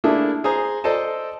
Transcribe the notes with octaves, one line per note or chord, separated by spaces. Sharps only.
A3 A#3 D4 E4 G#4
G#4 C5 A#5
A4 C5 D5 D#5 A5